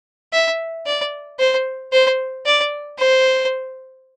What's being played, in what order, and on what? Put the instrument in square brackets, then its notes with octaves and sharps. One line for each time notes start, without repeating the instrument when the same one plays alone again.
[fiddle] E5
D5
C5
C5
D5
C5